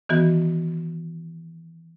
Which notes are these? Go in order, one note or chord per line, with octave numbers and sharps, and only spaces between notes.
D#3 E3 B3 F#4